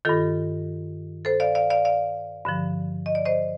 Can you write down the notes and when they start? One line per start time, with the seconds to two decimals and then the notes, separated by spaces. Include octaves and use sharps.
0.05 G2 D#3 F4 A4
1.25 A4 C5
1.40 D5 F5
1.55 D5 F5
1.70 D5 F5
1.85 D5 F5
2.45 G2 D3 F3
3.06 D#5
3.15 D5
3.25 C5 D#5